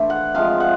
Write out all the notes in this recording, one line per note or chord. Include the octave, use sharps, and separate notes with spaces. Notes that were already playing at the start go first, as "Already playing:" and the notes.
Already playing: E3 A3 D4 C5
F#5
C3 F3 G#3 F5
F#5